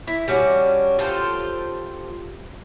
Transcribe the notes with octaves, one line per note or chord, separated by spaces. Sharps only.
E4
G3 C#4 D4 F#4
F4 G4 A4 C5